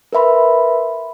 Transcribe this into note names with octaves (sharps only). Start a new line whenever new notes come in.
A#4 B4 E5 B5 C6